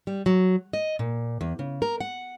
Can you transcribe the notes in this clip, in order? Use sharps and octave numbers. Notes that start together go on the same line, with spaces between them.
G3
F#3
D#5
A#2
E2
C#3
A#4
F#5